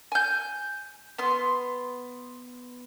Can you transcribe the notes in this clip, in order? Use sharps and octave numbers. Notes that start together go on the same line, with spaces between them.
G#5 G6
B3 C6